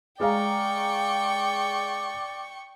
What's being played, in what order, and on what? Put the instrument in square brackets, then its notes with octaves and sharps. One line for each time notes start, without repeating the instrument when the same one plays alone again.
[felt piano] G#3 F5 A#5 [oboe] D5 [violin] G5 C#6